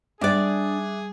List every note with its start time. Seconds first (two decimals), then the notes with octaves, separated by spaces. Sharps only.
0.21 G3 D4 G#4 D5 E5 D6 F#6